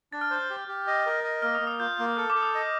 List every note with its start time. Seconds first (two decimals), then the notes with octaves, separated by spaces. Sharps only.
0.13 D4 A6
0.21 F6
0.31 C5 G6
0.50 G4
0.68 G4
0.87 D#5
1.06 A#4
1.24 D#5
1.42 A#3 F6
1.55 D#6
1.61 A#3
1.67 D#6
1.80 F4 G6
1.99 A#3
2.17 A4 F6
2.30 D6
2.35 A4
2.42 D#6
2.55 D#5